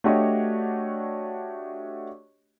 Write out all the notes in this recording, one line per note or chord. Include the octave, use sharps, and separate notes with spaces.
A3 D4 F#4 G4 C#5 D#5